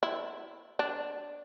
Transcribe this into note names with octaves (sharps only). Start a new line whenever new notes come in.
E4
D4